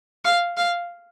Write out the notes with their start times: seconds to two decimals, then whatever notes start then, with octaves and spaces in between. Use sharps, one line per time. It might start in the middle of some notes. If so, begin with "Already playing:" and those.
0.24 F5
0.57 F5